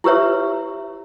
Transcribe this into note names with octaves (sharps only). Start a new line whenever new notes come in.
E4 G4 B4 C#5 E5